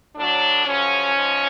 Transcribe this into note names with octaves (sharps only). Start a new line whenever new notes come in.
A2 F#3 D4
F#2 C#3 F3 C#4
G#2 F3